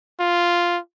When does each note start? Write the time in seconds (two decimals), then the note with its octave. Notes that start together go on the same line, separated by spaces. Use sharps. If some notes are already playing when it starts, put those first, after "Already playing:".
0.20 F4